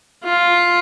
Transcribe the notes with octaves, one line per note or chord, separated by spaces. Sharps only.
F4